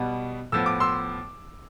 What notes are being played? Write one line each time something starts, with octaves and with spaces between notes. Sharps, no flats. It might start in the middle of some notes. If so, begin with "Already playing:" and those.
Already playing: B2 G3 B3
A2 F3 B3 E6
D6
C6 E6